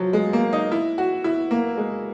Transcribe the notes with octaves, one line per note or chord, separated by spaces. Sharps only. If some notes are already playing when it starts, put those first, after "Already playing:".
Already playing: F3 F#3
G#3
A#3
D#4
E4
F#4
E4
A#3
G#3